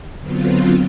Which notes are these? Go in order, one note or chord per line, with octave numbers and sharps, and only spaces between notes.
D3 F#3 B3 C4 F4